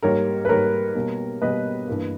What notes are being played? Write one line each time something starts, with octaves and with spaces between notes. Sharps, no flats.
G#2 G3 A#3 A#4 C#5
B4
G#2 G3 A#3 A#4 C#5
B2 G3 A#3
B2 G3 A#3 B4 D#5
G2 E3 A#3